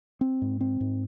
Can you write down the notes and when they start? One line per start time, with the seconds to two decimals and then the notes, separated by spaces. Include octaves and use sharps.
0.21 C4
0.42 G#2
0.61 C4
0.80 G#2